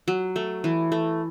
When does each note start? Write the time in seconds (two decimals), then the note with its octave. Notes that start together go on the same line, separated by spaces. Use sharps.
0.08 F#3
0.36 A3
0.64 E3
0.92 A3